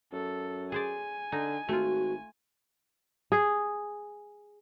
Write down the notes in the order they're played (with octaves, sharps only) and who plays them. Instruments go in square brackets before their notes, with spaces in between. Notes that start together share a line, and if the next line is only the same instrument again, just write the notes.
[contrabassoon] F#2 [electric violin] A4
[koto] G#4 C5 D5 [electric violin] G#5
[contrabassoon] D3 [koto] D#4
[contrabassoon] G#1 [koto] A3 F4 [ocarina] F#4
[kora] G#4